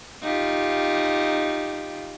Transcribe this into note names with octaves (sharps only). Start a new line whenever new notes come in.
D#4 F4 G4